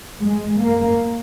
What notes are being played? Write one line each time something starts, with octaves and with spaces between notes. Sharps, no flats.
G#3
A#3